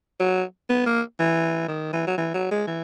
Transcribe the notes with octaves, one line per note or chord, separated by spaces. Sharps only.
F#3
B3
A#3
E3
D#3
E3
F#3
E3
F#3
G#3
E3